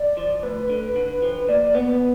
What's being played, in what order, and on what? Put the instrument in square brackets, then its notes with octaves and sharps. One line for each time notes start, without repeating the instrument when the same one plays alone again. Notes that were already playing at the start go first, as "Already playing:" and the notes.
Already playing: [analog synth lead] D5
[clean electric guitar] F3
[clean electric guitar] D2 [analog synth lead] B4
[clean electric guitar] D3
D3
F3
[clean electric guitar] A#2 [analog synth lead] D5
[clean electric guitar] B3 [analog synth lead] B4